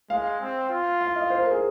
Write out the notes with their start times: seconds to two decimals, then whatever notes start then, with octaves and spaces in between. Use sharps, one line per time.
0.10 G#3 F5
0.41 C4
0.70 F4
1.01 F5
1.16 D#5
1.30 C5
1.40 A#4
1.51 G#4